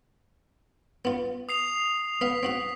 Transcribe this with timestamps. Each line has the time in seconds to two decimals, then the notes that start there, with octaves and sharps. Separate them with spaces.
1.05 B3 F4
1.49 D#6 C7 F7
2.21 B3 F5 B6
2.43 C4 F#4 F#5